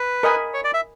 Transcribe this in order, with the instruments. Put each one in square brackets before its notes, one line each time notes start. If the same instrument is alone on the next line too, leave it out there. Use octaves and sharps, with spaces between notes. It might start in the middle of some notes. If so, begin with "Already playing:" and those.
Already playing: [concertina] B4
[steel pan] A#4 D#5 G#5 B5
[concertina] C#5
D5
E5